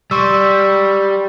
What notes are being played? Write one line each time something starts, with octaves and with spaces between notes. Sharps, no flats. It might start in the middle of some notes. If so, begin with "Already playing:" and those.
G3 C6 C#6 E6